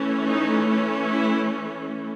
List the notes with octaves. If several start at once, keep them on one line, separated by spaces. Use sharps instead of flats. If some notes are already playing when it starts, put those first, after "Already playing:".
Already playing: E3 A3 C#4
D#4
E4